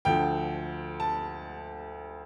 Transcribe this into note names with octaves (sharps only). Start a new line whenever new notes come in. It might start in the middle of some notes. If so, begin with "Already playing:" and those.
D2 D3 F3 G5
A5